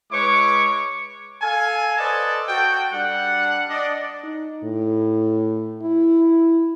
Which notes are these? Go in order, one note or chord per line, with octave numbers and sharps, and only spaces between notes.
G#3 E4 B4 C#5 C#6 D6
A4 F5 G#5
A4 B4 C5 D5 D#5 A5
F#4 A4 G5
G3 D4 F#5
D4 D5 D#5
D#4
A2
E4